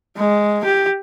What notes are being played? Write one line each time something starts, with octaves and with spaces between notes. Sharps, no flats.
G#3
G4